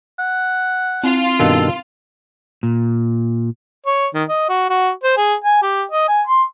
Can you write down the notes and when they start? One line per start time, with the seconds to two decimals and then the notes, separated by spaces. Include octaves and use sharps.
0.19 F#5
1.04 C4 F4
1.40 G2 B2 D#3 A4
2.63 A#2
3.86 C#5
4.14 D#3
4.29 D#5
4.49 F#4
4.70 F#4
5.04 C5
5.17 G#4
5.44 G#5
5.62 G4
5.92 D#5
6.08 G#5
6.27 C6